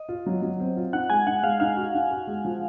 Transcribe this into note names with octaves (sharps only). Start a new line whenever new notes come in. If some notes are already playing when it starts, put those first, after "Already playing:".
Already playing: D#5
F4
F#3
F#3
C4
F4
D#4 F#5
G#3 G#5
D#4 F#5
G#3 F5
D#4 F5
F#4
D#4
F#4
G#3
F3